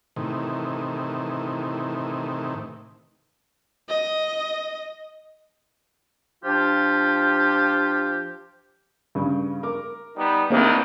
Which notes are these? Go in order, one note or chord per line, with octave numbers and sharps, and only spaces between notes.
A2 C3 D#3 E3
D#5
F3 D4 F4 G4
G2 C#3
A#4 D6
G3 B3 D#4
C2 D#3 E3 A#3 C4